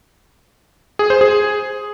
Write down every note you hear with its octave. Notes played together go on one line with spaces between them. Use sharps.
G#4
C5
G#4